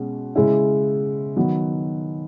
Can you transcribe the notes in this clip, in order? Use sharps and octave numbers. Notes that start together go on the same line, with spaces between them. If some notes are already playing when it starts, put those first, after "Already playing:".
Already playing: B2 G#3 C#4
C#3 G#3 C#4 E4
D#3 F#3 B3